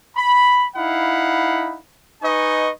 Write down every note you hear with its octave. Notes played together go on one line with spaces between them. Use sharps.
B5
D#4 E4 F5 F#5 B5
D#4 B4 D#5 G#5 C#6